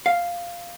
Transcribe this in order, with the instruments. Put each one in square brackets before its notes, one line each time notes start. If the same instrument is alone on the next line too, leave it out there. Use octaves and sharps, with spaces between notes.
[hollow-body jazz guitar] F5